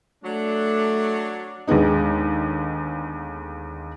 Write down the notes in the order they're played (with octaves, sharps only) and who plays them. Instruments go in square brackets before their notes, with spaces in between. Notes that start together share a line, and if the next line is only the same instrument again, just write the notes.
[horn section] F#3 D4 [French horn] A3
[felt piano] D#2 D3 G#3 B3 D#4